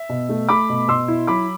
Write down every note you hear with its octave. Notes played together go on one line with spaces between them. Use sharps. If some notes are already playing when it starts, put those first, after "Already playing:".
Already playing: E5
B2
A3
A3 B5 D6
B2
B2 C6 E6
E4
F#3 B5 D6